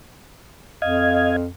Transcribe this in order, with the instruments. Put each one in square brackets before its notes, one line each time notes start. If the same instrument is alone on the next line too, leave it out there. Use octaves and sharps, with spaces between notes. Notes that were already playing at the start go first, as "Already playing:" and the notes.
[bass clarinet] F2 [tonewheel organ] D#5 F5 G#6